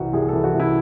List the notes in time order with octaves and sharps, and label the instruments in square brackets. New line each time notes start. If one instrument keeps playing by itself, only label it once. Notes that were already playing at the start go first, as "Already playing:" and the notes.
Already playing: [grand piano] C2 C3 E3 F#4
C2 G#4
E3 A4
F#4
C2
E4